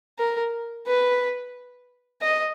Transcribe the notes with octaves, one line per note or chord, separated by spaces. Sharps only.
A#4
B4
D#5